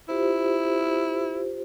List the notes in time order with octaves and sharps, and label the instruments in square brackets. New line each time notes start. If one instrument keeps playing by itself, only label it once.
[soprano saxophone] E4 [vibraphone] F4 G4 C5